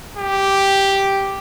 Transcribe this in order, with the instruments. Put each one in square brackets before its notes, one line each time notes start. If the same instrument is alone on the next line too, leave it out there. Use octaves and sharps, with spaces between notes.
[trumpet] G4